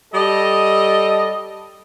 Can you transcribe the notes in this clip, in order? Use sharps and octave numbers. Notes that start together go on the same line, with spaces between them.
G3 A4 D#5